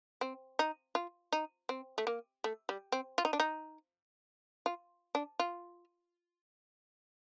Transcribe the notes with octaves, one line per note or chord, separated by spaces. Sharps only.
C4
D#4
F4
D#4
C4
A3
A#3
A3
G3
C4
F4
D#4
D4
D#4
F4
D4
F4